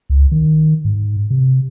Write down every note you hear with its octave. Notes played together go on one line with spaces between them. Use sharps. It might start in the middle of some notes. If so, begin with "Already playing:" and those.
C#2
D#3
G#2
C3